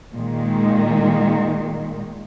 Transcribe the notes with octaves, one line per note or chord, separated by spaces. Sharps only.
A#2 D#3 G#3